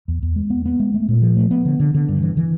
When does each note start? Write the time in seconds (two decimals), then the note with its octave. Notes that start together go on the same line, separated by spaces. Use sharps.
0.08 E2
0.22 E2
0.36 G#3
0.50 B3
0.66 B3
0.80 G#3
0.94 A3
1.08 A#2
1.22 F3
1.37 A3
1.51 B3
1.65 D3
1.80 D3
1.94 D3
2.09 G2
2.23 E3
2.37 E3